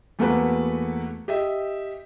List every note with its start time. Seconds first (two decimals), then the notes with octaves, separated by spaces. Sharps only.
0.19 E2 A3 A#3 F#4 B4
1.28 G4 D#5 E5